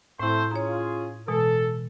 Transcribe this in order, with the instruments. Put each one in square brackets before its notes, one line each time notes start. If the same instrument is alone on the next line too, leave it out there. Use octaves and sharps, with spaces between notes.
[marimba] A2 E4 [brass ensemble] A3 C4 C5
[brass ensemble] C#4 F4 G#4 [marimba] C#5 A#5
[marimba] B2 E3 G#3 [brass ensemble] A4